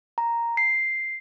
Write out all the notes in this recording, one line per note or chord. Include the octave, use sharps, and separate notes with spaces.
A#5
C7